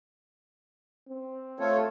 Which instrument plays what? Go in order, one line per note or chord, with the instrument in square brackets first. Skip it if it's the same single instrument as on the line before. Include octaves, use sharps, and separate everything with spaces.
[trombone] C4
[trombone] A3 [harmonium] F4 A4 C#5